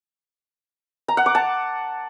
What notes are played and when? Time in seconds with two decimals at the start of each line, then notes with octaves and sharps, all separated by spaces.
1.08 A#5
1.17 F#5
1.26 D6
1.35 A5